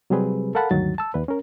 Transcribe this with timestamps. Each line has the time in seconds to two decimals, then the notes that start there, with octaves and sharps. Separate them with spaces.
0.10 C3 F#3 G3 C4 G#4 B4
0.55 A4 A#4 F5 F#5 A5 B5
0.71 D2 G2 D#3 F#3 A6
0.98 A5 E6
1.14 D#2 B4
1.28 C#4 A#4